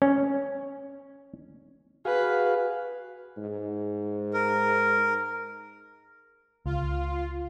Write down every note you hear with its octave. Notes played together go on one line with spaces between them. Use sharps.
C#4
F#4 G#4 B4 F5
G#2
A#4
C#2 F4